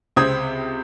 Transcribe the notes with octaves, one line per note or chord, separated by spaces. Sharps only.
C#2 C3 C4 D#6 G#6